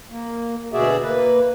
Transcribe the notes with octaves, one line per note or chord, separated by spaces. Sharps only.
A#3
D2 B2 F#4 G#4 D5 E5
A#3 B4